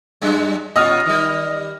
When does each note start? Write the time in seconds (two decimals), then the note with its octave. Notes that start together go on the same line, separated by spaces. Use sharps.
0.22 F#2 G3 G#3
0.76 A#2 C#4 F4 D#5 D#6 F6
1.06 D#3 G3